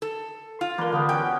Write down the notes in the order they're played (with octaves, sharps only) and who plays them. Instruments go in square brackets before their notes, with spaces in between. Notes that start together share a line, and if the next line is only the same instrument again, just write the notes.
[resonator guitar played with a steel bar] A4
F4
[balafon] E3 A#4 [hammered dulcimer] A#3 D4
[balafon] D3 [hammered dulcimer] A#3 B3 G4
[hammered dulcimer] C#4 F#4 [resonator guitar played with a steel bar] G5